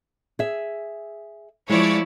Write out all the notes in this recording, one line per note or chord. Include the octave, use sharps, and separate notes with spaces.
G#4 E5
F3 G#3 E4 C#5 D5